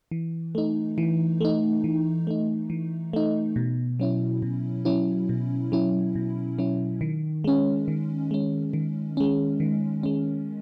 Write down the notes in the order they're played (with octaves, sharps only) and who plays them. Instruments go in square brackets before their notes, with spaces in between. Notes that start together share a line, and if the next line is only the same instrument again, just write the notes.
[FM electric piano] E3
A3 D#4
E3
A3 D#4
E3
A3 D#4
E3
A3 D#4
B2
F#3 C#4 E4
B2
F#3 C#4 E4
B2
F#3 C#4 E4
B2
F#3 C#4 E4
D#3
G#3 C#4
D#3
G#3 C#4
D#3
G#3 C#4
D#3
G#3 C#4